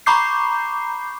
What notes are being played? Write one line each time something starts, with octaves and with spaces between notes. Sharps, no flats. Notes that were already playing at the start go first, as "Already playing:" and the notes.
A#5 B5 C#6 D6 G6 C7